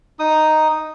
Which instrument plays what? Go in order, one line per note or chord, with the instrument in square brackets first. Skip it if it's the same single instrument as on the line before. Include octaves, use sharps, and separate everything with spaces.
[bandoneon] D#4 D#6